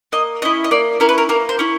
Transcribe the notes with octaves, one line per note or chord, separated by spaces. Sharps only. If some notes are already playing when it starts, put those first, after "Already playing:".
A#3 D#5
C#4 E4 D#5
D#5
A#3 D5
C#4 E4 A#4
B4
A#4
A#3 A#4
C5
C#4 E4